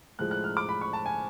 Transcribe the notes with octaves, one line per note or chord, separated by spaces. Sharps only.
A2 F3 G#3 F#6
F#6
F6
D6
B5
C#6
A5
G#5